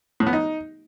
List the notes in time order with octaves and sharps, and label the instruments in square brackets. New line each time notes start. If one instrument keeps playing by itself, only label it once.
[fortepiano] A2
B3
D#4